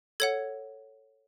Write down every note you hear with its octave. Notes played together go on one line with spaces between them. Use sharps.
A4 C#5 F#5 G#6